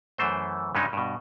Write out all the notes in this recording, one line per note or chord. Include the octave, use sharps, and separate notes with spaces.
F#2 E3 A3 C5
G2 C#3 F#3 G#3 C#4 D#4
G2 B2